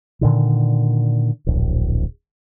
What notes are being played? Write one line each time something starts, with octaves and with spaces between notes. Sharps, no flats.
A#2 D3 D#3
D1 A#1